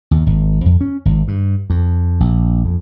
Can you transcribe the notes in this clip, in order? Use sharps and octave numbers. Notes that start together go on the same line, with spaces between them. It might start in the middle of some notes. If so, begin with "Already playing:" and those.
D#2
G#1
F2
C#4
G#1
G2
F2
A#1
F2